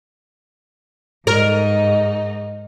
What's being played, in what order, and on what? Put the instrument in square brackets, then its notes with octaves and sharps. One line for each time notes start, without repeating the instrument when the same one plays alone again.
[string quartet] G#2 D#4 [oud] A#4